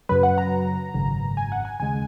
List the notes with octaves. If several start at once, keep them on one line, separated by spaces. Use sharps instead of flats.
F#2 C#3 F#3 B4
F#5
A#5
G#1 F#2 C#3
G#5
F#5
G#5
D#2 C#3 G#3 G#5